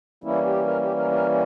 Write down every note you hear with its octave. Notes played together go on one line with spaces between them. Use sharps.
E3 G3 A#3 C#4 E4
G4
A#4
G4
A#4
A#4